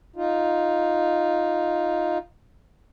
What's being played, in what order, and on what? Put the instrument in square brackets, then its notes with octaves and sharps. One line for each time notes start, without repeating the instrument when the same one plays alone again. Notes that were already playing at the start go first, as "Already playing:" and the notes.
[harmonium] D#4 F4